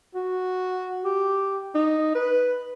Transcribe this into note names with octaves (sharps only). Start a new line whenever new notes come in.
F#4
G4
D#4
B4